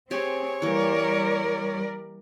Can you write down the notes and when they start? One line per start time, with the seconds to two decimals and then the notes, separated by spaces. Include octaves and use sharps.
0.11 C4 G4 G#4 C#5 G#5
0.62 E3 G3 A#3 A#4 D5